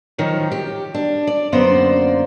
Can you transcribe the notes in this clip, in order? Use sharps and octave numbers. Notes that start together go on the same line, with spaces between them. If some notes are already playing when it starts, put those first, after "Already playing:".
D#3 F3 F#3
G4
D4
D5
F#2 D3 A#3 B3 C5 D5